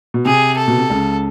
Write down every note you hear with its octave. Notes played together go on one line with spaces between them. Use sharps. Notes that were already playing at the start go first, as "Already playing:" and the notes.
B2
C3 G#4
A4
B2
C3
C#2 C#3